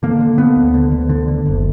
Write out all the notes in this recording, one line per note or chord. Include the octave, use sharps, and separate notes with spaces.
D3 A#3
D3
D3 B3
D2
D3
D2
D3
D3
F#1